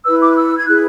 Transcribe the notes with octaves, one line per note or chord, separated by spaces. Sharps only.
E4 B4 E6
D6
F#6
E6
G#6
E4 G#4 B4 F#6